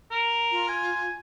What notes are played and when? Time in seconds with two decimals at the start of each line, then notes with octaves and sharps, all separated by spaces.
0.11 A#4
0.51 F4
0.68 G#5